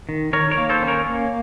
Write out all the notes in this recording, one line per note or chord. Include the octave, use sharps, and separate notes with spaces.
D#3
D#3 A#4 C#5
A#4 C#5
A#3
A4 C5
C#4
A#4 C#5
A#3